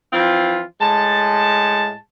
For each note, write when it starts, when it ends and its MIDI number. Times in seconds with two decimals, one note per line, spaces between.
0.13 0.63 52
0.13 0.63 53
0.13 0.63 60
0.13 0.63 65
0.81 1.96 45
0.81 1.96 56
0.81 1.96 81